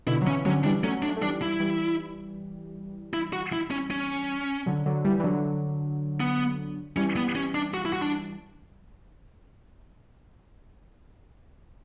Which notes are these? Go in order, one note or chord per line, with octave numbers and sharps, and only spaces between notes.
B2 D3 E4
F#3
C#3 E3 C#4
D3 F#3 C#4
E3 G3 D4
F#3 A3 C#4
D4
A3
E3 G3 D4
E4
E3 G3
E4
F#4
E4
C#4
C#4
D3 F#3
D3 F#3
E3 G3
E3
D3 F#3
B3
E3 G3 C#4
B3
C#4
D4
F#4
E4
F#4
D4